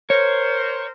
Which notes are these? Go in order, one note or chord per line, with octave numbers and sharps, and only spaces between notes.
A#4 C5 C#5